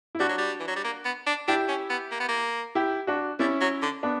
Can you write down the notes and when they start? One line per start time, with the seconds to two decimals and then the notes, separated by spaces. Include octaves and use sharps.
0.15 E4
0.20 G3 D4 F#4
0.29 F#3
0.38 G3
0.60 E3
0.68 F#3
0.76 G3
0.84 A#3
1.05 B3
1.27 D4
1.48 D4 E4 G4
1.69 C#4
1.90 B3
2.12 A#3
2.20 B3
2.29 A#3
2.75 E4 G4
3.07 D4 F#4
3.39 G3 C#4 E4
3.61 F#3
3.82 D3
4.03 B3 D4